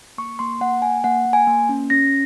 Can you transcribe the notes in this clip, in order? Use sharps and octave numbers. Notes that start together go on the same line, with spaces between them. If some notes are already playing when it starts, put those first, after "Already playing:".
A#3 C#6
A#3 C6
A#3 F#5
A#3 G#5
A#3 F#5
A#3
G#5
A#3
C#4
C#4 A#6